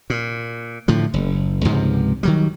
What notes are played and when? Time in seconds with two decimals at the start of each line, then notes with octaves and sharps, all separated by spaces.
0.10 A#2
0.88 A2 D3 F3
1.14 F#1
1.65 C#2 G#2 C3 F3
2.23 D#3 F#3 G3